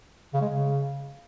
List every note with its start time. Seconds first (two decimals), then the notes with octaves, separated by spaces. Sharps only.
0.34 C#3
0.41 G#3
0.49 C#3